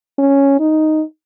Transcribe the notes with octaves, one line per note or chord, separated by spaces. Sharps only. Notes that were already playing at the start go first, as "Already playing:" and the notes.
C#4
D#4